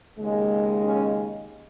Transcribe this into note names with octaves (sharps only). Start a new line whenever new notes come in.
D#2 C#3 G#3
C#4